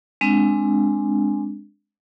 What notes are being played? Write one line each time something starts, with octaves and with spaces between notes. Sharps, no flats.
G#3 C4 D4